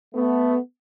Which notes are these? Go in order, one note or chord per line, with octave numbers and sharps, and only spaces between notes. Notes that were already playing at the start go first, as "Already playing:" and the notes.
A3 B3